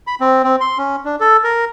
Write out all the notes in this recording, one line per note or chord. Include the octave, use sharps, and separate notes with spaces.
B5
C4
C4
C6
C#4
D4
A4
A#4